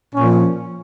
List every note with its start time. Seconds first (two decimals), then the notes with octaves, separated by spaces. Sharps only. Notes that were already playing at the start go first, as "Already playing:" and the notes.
0.14 A#2 F3 C#4